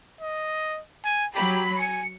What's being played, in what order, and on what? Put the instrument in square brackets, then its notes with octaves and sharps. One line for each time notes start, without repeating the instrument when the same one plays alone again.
[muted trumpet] D#5
G#5
[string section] F#3 B5 [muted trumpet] G4
[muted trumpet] G#5 [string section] C#7